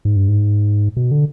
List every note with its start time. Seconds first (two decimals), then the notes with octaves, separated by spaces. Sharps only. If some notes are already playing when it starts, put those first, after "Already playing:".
0.05 G#2
0.16 G2
0.28 G#2
0.97 B2
1.11 D3